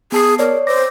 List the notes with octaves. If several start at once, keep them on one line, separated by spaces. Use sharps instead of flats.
B3 G#4 A5 C7
A#4 C#5 D5
C5 D6 A#6